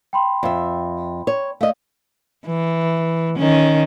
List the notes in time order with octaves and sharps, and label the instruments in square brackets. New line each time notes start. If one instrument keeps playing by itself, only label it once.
[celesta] G5 B5 C6
[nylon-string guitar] F2 E5
C#5
[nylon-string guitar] A3 D#5 [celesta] D5 F5
[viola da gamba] E3
D#3 C#4